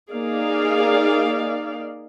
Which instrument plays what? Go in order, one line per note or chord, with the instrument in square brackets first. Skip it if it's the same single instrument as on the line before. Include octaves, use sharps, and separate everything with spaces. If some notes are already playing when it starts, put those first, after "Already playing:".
[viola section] A#3 D#4 G#4 D5 F5